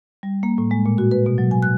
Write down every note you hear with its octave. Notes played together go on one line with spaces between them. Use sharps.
G3
A#3
A2
G#3
A#2
F#4
B4
B2
F#3
G#5
F#6